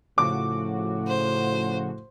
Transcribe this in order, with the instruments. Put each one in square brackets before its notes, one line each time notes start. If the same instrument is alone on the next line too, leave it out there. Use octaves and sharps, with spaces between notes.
[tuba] A2 [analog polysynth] C#3 F3 F#4 [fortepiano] D6
[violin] C5